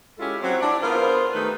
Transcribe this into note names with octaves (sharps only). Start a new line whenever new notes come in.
G#3 C#4 E4 F4 G4 A4
F#3 C4
D4 E4 D5
B3 F4 G#4 A#4 C5
D#3 A3 D#4 G4 B4